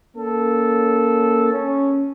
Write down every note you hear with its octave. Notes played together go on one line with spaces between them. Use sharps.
A#3 C#4 A4
C#4